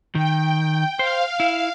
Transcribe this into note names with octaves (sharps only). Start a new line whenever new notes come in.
D#3 G5
C5 F5
E4